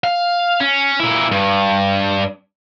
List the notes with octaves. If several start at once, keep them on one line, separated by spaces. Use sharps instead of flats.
F5
C#4
A#2 E4
G2